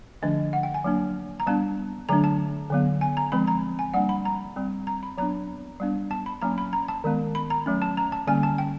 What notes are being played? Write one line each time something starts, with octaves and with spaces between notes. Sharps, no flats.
D3 F3 A3 D4 D#5
F#5
G5
G#5
F#3 A#3 D4
A#5
G3 B3 D4 A5
D3 F#3 A3 D4 A#5
A5
D3 F#3 B3
G#5
A#5
F3 G#3 C4 B5
A#5
G#5
G3 A#3 D4 F#5
B5
A#5
G3 C4
A#5
B5
F#3 B3 D4 A#5
G3 B3 D4
A5
B5
F#3 A#3 C#4 A#5
B5
A#5
A5
D#3 G#3 B3
B5
A#5
F#3 A3 C#4
A5
A#5
A5
D3 G3 A#3 C#4 G#5
A5
G5